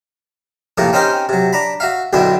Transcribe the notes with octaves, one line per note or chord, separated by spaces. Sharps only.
A2 C3 F3 A3 A#3
C4 C#4 D#4 G4 A#4 C5
C3 F#3
D4 A#5 B5
F#4 E5 F5
B1 F#2 B2 D3 C4 E4